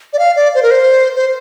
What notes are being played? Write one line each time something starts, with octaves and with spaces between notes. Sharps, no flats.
D5
F5
D5
C5
A#4
C5
C5